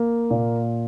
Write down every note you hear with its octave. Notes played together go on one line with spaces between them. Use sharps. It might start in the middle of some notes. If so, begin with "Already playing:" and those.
Already playing: A#3
A#2